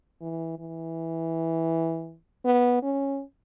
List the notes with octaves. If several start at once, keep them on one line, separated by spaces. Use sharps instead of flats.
E3
E3
B3
C#4